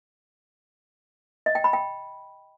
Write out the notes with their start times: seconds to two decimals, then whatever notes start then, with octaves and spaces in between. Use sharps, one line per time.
1.46 D#5
1.55 G5
1.64 B5
1.73 G5